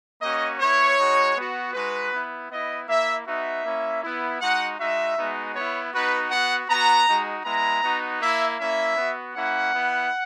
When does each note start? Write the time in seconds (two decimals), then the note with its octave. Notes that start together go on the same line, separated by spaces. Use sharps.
0.22 A#3 C#4 F#4 D#5
0.59 B3 E4 C#5
0.98 G#3 D#4 F#4
1.36 B3 F#4
1.74 G#3 D#4 F#4 B4
2.11 B3 E4
2.50 B3 E4 D#5
2.87 A#3 E4 E5
3.26 B3 D#4 F#4 E5
3.64 A#3 C#4 E4
4.02 B3 E4
4.40 G#3 D#4 F#4 F#5
4.79 G#3 D#4 F#4 E5
5.16 G#3 B3 D#4 F#4
5.54 B3 E4 C#5
5.92 B3 D#4 F#4 B4
6.30 B3 F#4 F#5
6.68 B3 F#4 A#5
7.06 G#3 D#4 F#4
7.44 G#3 B3 E4 A#5
7.83 B3 D#4 F#4
8.21 A#3 E4 E5
8.58 A#3 C#4 E4 E5
8.97 B3 F#4
9.34 A#3 C#4 E4 F#5
9.73 B3 E4